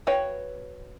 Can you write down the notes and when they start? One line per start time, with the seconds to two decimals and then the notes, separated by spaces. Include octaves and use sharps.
0.07 F#4 B4 C#5 F5 G5